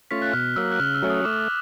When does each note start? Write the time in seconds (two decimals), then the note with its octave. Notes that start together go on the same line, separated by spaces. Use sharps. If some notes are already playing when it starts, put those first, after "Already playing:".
0.11 A3 C#4 F4 B6
0.22 F#6
0.33 B2 F6
0.56 F#3 A#3 E6
0.72 F#6
0.79 C#3 F6
0.95 E6
1.02 F#3 A3 C#4
1.10 D#6
1.25 A3 D6